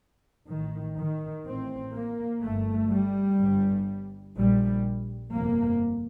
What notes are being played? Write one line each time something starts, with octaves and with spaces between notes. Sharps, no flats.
A1 A2 D#3
D#3
A1 A2 C4
A#3
G1 G2 A3
G3
G1 G2
A#1 A#2 G3
G1 F2 C3 A#3